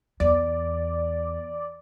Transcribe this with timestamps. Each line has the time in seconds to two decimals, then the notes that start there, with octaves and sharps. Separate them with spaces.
0.20 E2 D5